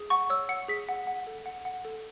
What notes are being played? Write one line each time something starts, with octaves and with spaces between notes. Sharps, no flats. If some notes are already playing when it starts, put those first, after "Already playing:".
Already playing: G#4
F#5 C#6
C#5 E6
F#5 C#7
G#4 B6
F#5
F#5
A4
F#5
F#5
A4